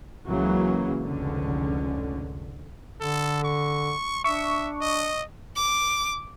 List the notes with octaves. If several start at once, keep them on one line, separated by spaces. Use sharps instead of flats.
C#2 C#3 E3 F#3 A#3
F1 C#2 G#2 D3 C#4
D3 A4
C#6
D4 E5 C#6
D#5
D6